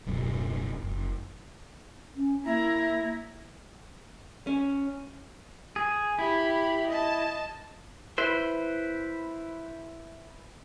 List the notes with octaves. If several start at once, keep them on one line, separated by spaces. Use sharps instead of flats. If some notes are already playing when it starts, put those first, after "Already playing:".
D1 F#2 B2
F#1
C#4
A#3 E4 A#5
C#4
G#4
E4 G4 B5
D#5 A5
E4 B4 C5